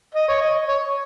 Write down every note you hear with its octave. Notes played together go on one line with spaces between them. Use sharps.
D#5
C#5
D#5
C#5